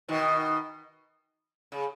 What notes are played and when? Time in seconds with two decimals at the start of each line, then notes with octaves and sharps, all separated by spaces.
0.08 B2 D#3
1.72 C#3